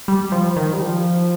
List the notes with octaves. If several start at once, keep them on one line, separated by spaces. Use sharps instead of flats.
G3
F3
D#3
G3
F3